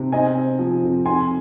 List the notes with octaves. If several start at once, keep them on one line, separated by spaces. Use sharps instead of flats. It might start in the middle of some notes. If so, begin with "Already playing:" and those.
Already playing: C3
C4 D#5 G#5
C4
F3
F2
F2 G#5 C6